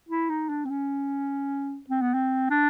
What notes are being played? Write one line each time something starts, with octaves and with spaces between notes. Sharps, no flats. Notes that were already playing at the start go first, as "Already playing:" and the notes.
E4
D#4
D4
C4
C#4
C4
B3
C4
D4